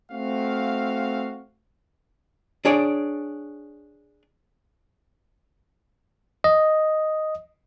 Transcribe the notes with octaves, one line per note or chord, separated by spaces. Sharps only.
A3 C4 F#4 F5
D4 G#4 C#5 D5
D#5